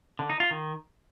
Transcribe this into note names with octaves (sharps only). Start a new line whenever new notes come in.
D3
D#4
F4
D#3